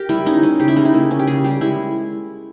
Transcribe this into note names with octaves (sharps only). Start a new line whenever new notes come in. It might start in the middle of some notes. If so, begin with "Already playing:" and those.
Already playing: G4 A#4
G3 E4
C#4 D#4
C#4
C#3 G4
E4
C#3 D#4
E4
A#3
C#4
G4
C#3 G#4
G3 G4
G#3 E4